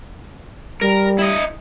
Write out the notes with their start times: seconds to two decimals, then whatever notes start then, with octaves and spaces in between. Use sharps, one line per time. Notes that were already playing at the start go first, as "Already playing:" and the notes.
0.81 G3 A#4
1.19 E4 D#5